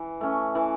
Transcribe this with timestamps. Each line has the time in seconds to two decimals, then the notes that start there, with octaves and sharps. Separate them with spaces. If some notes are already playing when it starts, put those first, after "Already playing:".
Already playing: E3
0.21 A3 C#4
0.55 E3